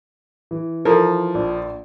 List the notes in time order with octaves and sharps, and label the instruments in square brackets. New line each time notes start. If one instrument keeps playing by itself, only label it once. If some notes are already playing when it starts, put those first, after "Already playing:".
[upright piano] E3
[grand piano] F3 [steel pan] A4 A#4
[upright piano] A#1